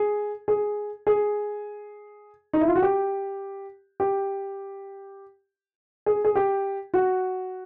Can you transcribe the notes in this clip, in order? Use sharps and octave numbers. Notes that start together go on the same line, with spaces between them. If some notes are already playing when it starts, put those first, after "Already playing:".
Already playing: G#4
G#4
G#4
D#4
E4
F4
F#4
G4
G4
G#4
G#4
G4
F#4